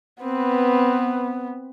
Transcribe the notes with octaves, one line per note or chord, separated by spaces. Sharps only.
B3 C4 B4